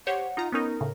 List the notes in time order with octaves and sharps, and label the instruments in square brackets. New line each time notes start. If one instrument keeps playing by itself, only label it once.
[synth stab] G4 C5 C#5 [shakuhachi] F#5
[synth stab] D#4 F4 A#5
[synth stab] B3 C#4 D#4 [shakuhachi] A#4
[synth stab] A2 C#3